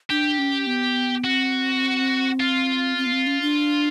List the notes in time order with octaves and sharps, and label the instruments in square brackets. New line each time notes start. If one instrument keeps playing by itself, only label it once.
[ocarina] D4 [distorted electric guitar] G4
[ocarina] C#4
B3
[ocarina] C4 [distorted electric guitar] F#4
[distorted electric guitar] F4
[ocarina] C4
B3
C4
C#4
D4